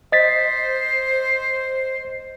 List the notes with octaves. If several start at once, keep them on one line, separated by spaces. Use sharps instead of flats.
C5 D#5 A6 B6